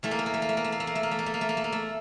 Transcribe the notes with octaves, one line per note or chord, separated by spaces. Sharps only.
E2 E3 A3
A#3
A3
A#3
A3
A#3
A3
A#3
A3
A#3
A3
A#3
A3
A#3
A3
A#3
A3
A#3
A3
A#3
A3
A#3
A3